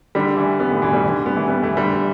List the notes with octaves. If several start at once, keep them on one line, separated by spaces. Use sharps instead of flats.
D3 G3
E3 A3
G3 B3
A2 D3
B2 E3
D3 G3
D3 G3
G3 B3
E3 A3
G3 B3
E3 A3
D3 G3